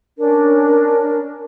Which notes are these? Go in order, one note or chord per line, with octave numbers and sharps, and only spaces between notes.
C#4 D4 A#4